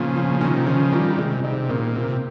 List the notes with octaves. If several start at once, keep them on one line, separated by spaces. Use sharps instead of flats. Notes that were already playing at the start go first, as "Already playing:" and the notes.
Already playing: A#2 C#3 F3
A#2
C3 D#3 C#4
C#3 F3 C#4
D#3 G3 F4
C3 G#3
C3 D#4
A#2 D#3
C3 A#3